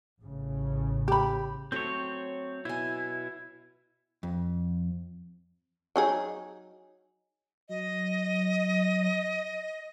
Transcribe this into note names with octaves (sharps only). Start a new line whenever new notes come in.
A1 A2 C#3
G4 B5
F#3 A3 C4 C#5
B2 E4 G#5
F2
F#3 D#4 G#4
F#3 D#5